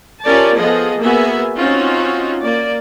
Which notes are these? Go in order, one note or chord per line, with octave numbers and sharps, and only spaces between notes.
C#4 F4 G4 A#4 D5 A5
F3 B3 G#4 A4 D#5
A#3 B3 F#4 G#4 E5 G#5
C4 C#4 D#4 F4 F#4
A#3 D5